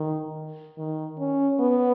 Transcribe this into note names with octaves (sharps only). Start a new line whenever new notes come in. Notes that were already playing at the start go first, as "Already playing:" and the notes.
Already playing: D#3
D#3
C#4
B3